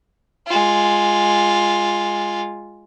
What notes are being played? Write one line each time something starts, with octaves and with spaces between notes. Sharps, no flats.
G#3 F4